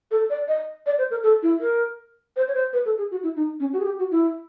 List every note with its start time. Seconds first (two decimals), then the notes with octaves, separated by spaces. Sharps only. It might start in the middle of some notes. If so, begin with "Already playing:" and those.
0.11 A4
0.30 D5
0.48 D#5
0.86 D5
0.98 C5
1.11 A#4
1.23 A4
1.43 E4
1.60 A#4
2.36 C5
2.48 C#5
2.54 C5
2.73 B4
2.85 A4
2.98 G#4
3.11 F#4
3.23 E4
3.36 D#4
3.60 C#4
3.73 F#4
3.80 G#4
3.85 G4
3.99 F#4
4.11 E4